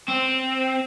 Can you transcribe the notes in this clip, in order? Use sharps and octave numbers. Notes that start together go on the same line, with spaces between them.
C4